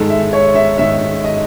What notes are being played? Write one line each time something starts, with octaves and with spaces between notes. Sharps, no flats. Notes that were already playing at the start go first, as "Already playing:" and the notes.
Already playing: G#2 D#3 G#3 A4
E5
C#5
E5
G#2 D#3 G#3 E5
D#5